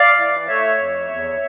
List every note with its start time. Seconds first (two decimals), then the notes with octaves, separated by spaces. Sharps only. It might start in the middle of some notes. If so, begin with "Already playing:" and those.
Already playing: D5 F5
0.17 E3
0.48 A3 C#5 E5
0.78 F2
1.09 E2